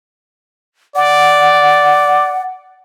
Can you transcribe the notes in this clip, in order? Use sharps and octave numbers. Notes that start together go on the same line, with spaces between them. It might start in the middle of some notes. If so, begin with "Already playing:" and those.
D5 F#5